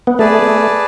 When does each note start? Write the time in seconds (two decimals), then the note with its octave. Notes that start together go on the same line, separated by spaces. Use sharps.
0.07 B3
0.19 A3 G#4 B4 D5 A5
0.43 B3
0.48 A3